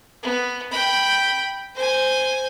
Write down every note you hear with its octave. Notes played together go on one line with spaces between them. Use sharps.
B3
G5 B5
C5 G#5